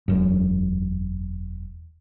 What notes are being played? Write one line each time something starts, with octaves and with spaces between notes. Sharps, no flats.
E1 F#2